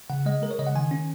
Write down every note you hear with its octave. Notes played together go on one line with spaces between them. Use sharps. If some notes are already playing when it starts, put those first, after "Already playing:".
C#3 F#5
G#3 D#5
G#3 A#4
C#5
C#3 D#5
F#5
D#3 G#5
C#4